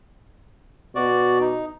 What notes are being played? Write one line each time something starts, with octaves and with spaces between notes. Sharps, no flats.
B2 F#4 D5
D#4